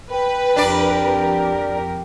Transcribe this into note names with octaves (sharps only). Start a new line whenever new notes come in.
B4 G5
F2 D4 G4 A#4 D5